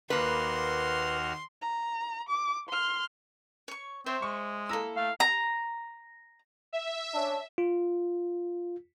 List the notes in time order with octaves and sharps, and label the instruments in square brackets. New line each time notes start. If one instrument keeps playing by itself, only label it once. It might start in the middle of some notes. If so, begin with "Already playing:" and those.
[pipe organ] D#2 F#4 F6 [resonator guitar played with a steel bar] A#3 B4 [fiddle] C6
[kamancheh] A#5
D6
C6 F6
[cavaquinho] C#5 C#6
[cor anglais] C4 [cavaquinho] C5 C#5 E5
[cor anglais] G#3 [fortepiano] C#6
[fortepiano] A#3 A#5 E6 [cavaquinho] E4 A4
[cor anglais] A3 [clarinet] F5
[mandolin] A#5
[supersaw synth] E5
[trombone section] C#4 D4
[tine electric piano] F4